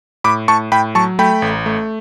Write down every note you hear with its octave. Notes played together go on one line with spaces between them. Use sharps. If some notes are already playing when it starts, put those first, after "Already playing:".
A2 B5 D6
A2 A5 C#6
A2 G5 B5
F#3 A5 C#6
A3 G5 B5
A1
A3